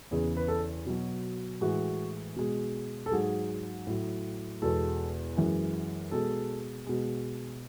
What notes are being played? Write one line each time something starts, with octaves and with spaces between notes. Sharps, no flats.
E2 C#3 E3 G#4
B4
A4
B2 F#3
A2 E3 G#3 F#4
B2 G#3
A4
G#2 F#3 G#4
A2 F#3
E2 B2 G#3 A4
F#2 E3 G#3
B2 G#3 A4
B2 G#3